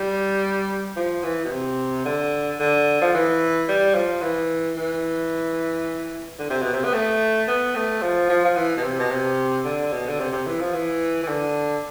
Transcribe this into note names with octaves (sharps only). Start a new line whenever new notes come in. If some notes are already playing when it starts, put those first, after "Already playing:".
Already playing: G3
F3
E3
B2
C3
D3
D3
F3
E3
G3
F3
E3
E3
D3
C3
B2
C3
B3
A3
B3
A3
F3
F3
F3
E3
B2
C3
B2
C3
D3
B2
D3
C3
C3
E3
F3
E3
E3
D3